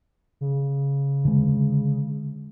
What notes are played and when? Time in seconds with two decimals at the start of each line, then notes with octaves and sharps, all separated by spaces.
0.41 C#3
1.25 D3 G#3